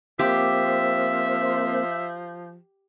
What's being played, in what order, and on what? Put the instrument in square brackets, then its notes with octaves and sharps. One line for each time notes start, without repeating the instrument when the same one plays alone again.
[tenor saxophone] F3 [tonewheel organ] A#3 C4 C5 [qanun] G4 [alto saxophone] E5